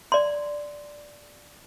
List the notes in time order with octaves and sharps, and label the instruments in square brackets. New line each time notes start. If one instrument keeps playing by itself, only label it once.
[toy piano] D5 C6